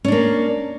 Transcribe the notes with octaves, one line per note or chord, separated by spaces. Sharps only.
A#3 C#4 D4